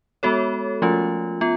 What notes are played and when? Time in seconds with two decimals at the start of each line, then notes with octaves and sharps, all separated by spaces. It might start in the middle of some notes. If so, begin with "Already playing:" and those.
0.23 G#3 B3 F#4 A4 C#5
0.82 F3 A3 C#4 F4
1.41 B3 F4